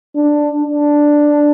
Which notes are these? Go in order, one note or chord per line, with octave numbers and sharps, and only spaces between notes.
D4
D4